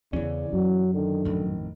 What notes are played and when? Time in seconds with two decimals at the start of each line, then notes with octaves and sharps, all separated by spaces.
0.13 E2 C#3 E3 C#4 D5
0.53 F#2 F#3
0.94 D3 D#3
1.25 A1 F2 D#3